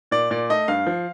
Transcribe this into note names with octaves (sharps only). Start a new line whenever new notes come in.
A#2 D5
A#2 D5
A3 D#5
G2 F5
F3